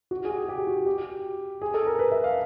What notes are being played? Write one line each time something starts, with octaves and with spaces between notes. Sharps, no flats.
F#4
G#4
G4
G4
F#4
G4
G#4
A4
A#4
B4
E5
F5